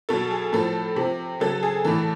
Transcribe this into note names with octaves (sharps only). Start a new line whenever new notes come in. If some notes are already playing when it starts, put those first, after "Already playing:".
B2 F#3 A4
G#4
A2 F3 A4
C3 F3
C#3 F#3 A4
G#4
A2 E3 A4